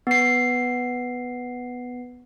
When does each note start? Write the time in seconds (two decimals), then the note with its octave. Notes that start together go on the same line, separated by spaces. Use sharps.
0.07 B3 C7